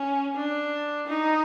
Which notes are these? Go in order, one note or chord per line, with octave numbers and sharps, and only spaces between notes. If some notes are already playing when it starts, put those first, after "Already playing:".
Already playing: C#4
D4
D#4